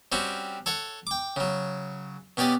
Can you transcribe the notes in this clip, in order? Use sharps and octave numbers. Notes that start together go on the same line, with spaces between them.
G3 C4 C#4 F#4
A4 C#5 F#5
G5 D6
C#3 F#3
B2 C#4 G4 D5 D#5